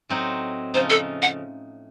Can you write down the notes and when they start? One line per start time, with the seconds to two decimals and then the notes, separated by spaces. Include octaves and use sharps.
0.09 A2 F#3 C4 D#4
0.74 C#3 F3 A3 D#4 C5
0.90 A4
1.22 F#5